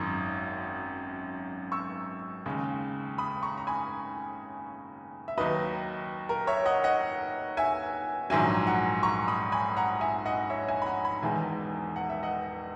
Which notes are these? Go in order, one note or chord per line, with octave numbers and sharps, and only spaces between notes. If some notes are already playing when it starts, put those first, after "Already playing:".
Already playing: G#1 F#2 D#3 D#6
C#6 E6
D#2 C#3 G#3
B5 D#6
A#5 C#6
A#5
G#5 B5
E5
D#2 D#3 F#3 B4 D#5
A#4
C#5 E5
D#5 F#5
D#5 F#5
E5 G#5
A#1 G#2 D#3 F#3 E5 G#5
F#5 A#5
A#5 C#6
B5 D#6
G#5 B5
F#5 A#5
E5 G#5
D#5 F#5
C#5 E5
E5 G#5
B5
F#5 A#5
G#5 B5
E1 E2 D#3 G#3 E5 G#5
F#5
E5
D#5 F#5